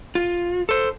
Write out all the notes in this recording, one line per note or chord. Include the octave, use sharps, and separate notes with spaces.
F4
A4 C5